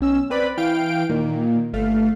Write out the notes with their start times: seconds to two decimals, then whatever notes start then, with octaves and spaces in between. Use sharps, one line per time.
0.01 B1 C#4 E6
0.30 C4 B4 D5 B5
0.57 E3 F5 G5 D7
1.09 A#2 D#3 A#3
1.73 G1 A3 F5